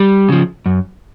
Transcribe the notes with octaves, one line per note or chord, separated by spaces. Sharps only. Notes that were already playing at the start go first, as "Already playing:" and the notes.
Already playing: G3
C#3 F3
F#2